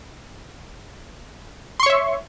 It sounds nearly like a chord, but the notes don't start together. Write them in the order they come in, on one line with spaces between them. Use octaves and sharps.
C6 C#6 C#5 E5